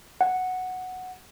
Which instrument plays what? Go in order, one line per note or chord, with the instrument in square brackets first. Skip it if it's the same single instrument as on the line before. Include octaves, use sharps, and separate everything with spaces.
[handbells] F#5